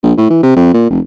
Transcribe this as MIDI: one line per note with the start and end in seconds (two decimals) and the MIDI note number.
0.03 0.12 34
0.17 0.27 45
0.30 0.39 52
0.43 0.54 48
0.56 0.69 41
0.74 0.89 46
0.90 0.99 29